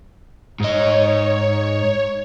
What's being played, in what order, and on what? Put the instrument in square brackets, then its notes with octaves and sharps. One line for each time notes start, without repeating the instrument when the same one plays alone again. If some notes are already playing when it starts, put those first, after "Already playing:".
[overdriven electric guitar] G#2 D#5 [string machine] C#5